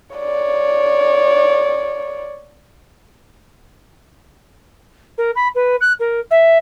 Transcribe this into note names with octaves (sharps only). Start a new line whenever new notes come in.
C#5 D5
A#4
B5
B4
F#6
A#4
E5